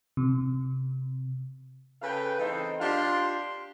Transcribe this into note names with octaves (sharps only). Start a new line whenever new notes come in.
C3
C#3 A4 B4 F5 G5
E3 C4 D#4 A4 C5
D4 F4 G4 F5 C6